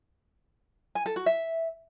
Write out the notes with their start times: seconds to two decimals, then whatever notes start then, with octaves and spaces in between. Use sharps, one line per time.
0.95 G#5
1.06 A4
1.16 F#4
1.26 E5